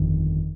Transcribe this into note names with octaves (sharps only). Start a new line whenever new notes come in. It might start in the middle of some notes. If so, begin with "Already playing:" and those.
Already playing: G1 F2 D#3